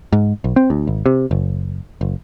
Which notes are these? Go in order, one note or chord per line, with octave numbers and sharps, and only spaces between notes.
G#2
B1
C4
D2
G#1
C3
F#1
F#1